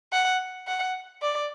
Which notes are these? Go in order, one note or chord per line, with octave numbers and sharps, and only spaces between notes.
F#5
F#5
D5